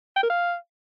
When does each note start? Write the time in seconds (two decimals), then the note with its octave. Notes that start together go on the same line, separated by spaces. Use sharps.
0.16 G5
0.23 A#4
0.30 F5